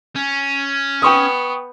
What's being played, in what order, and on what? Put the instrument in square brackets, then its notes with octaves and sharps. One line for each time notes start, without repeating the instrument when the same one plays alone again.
[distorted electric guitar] C#4
[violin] B3 [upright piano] G5 C#6 D#6